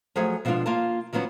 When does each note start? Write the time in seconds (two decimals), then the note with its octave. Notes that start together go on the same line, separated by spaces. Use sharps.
0.16 F3 F#3 A3 G#4 G#5
0.45 B2 F3 G#3 C#4 D4 F4
0.66 A#3 F4 A5
1.13 D#3 F3 F#3 B3 C#4